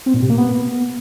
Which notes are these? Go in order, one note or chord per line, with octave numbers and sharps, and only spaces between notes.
C4
A#2
C3
A#3
B3